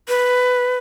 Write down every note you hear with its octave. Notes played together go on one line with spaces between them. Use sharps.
B4